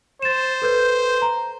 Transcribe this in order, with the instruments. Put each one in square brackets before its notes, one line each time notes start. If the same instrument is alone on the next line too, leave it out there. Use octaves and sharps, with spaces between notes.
[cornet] C5 [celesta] A6 E7
[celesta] A4 B4 G6
A#5